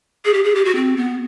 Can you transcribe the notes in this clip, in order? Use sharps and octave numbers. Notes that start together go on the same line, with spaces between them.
G#4
G4
G#4
G4
F#4
C4
B3